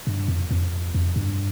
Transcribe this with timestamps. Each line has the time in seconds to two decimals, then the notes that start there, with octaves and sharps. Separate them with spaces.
0.07 G2
0.28 F2
0.51 F2
0.95 F2
1.16 G2